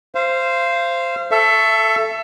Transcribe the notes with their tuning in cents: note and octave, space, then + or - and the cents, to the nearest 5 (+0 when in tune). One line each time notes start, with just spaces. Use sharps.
C5 +0 F5 -30
A4 +0 E5 +25 C#6 +0